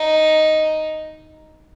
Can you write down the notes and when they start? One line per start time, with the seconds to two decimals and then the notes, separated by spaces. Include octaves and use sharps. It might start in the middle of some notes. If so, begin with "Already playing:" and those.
Already playing: D#4